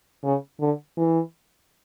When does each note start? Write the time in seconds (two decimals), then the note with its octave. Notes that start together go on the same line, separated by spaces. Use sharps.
0.24 C#3
0.60 D3
0.97 E3